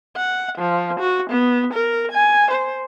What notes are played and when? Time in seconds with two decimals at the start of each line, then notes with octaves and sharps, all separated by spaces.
0.16 F#5
0.58 F3
1.00 F#4
1.30 B3
1.73 A#4
2.12 G#5
2.51 C5